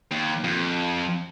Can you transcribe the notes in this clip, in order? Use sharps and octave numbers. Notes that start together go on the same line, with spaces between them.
D#2
F2